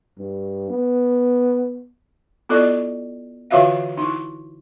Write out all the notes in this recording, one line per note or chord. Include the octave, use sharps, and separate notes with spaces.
G2
B3
B3 E4 F4 A4 D5 D#5
D3 E3 F4 F#4 E5 F5
D#4 E4